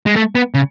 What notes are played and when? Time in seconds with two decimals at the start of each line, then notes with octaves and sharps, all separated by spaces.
0.06 G#3
0.16 A3
0.35 B3
0.54 C#3